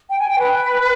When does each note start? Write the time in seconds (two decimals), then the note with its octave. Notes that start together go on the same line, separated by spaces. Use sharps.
0.09 G5
0.18 G#5
0.27 G5
0.38 B4